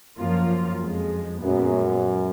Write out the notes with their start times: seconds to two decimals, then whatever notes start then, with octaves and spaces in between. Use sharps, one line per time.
0.18 F#2 F3 A#3 F4
0.80 F2 F3 G#3
1.41 F#2 A#2 G#3 B3